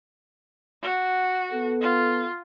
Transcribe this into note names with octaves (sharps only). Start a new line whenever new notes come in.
F#4
B3 A4
F4